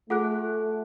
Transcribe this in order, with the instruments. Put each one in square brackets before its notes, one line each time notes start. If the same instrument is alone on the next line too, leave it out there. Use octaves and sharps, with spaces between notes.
[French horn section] A3 [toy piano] F4 G#4 G#5 [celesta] F#5 F#6